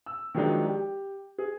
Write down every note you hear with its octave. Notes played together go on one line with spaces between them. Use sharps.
E6
D#3 F3 F#3 G#3 D4 D#4
G4
G#4